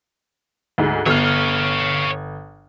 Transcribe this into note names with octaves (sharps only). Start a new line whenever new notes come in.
D2 G#2
G1 C#5 F5 F6